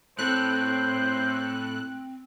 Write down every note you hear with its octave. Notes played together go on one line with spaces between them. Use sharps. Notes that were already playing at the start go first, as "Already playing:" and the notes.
A2 C4 A4 C5 F#6